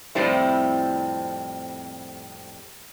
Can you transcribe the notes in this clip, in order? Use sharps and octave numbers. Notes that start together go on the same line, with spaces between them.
F2 A2 G3 C4 E4